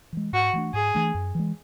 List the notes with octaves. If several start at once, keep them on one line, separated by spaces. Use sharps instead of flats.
E3 G#3
G#2 F#4
E3 A3 D4
G#2 G#4
E3 A3 D4
F#2
E3 G#3